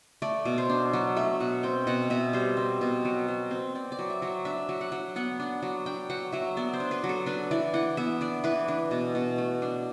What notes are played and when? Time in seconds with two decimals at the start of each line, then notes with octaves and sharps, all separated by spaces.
0.22 A3 D5
0.45 B2
0.58 C5
0.69 D4
0.93 F#3
1.16 A3 E5
1.40 B2 F#5
1.63 C4 G5
1.87 B2 F#5
2.10 B2 E5
2.33 G3 C5
2.57 C4
2.81 B2
3.05 F#3
3.28 F#3
3.51 C4
3.75 C4 D5
3.92 D5
3.99 F#3
4.10 E5
4.22 F#3
4.27 E5
4.45 D4 E5
4.69 F#3
4.81 F#5
4.92 F#3
5.16 B3 F#5
5.40 D4
5.63 F#3
5.86 D4 G5
6.10 F#3 F#5
6.32 F#3 E5
6.57 B3 D5
6.73 C5
6.80 D4
6.91 B4
7.04 F#3
7.09 A4
7.26 D4 B4
7.51 E3 D5
7.74 E3 F#5
7.97 B3 E5
8.21 D4 D5
8.44 E3 B4
8.68 D4
8.91 B2
9.15 B2
9.38 A3
9.62 D4